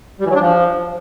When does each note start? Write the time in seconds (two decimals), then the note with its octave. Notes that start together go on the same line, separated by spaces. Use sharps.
0.20 G3
0.25 E3
0.30 F#3
0.35 D4
0.41 F3